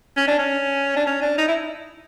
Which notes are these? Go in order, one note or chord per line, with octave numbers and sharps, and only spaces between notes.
C#4
D4
C#4
D4
C#4
D4
D#4
E4